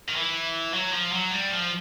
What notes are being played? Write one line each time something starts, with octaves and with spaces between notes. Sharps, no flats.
D#3
E3
F#3
F3
F#3
G3
F3